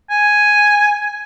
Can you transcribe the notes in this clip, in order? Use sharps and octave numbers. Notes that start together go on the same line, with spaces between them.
G#5